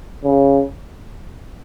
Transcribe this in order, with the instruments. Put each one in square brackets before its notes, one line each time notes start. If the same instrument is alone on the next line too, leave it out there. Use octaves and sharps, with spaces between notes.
[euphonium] C#3